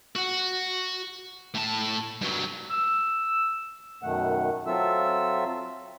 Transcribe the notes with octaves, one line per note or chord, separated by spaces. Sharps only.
F#4 F#5
A2 A5
G2 F#3
E6
F#2 B2 D#3 A3 F#5
F#3 C4 F4 A4 E5 E6